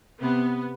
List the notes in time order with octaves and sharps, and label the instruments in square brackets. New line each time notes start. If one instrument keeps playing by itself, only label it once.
[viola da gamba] C3 [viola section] B3